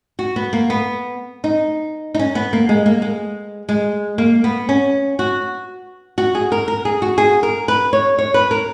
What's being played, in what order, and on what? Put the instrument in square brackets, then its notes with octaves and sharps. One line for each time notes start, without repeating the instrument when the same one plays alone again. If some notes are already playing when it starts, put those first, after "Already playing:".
[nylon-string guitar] F#4
B3
A#3
B3
D#4
D#4
C#4
B3
A#3
G#3
A#3
G#3
G#3
A#3
B3
C#4
F#4
F#4
G#4
A#4
A#4
G#4
F#4
G#4
A#4
B4
C#5
C#5
B4
A#4